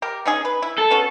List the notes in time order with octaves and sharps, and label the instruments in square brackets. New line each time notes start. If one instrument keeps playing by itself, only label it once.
[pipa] G4 A#4
C#4 D#4 G#4
B4
E4
[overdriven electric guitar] A4
[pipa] B3 C#4 F#4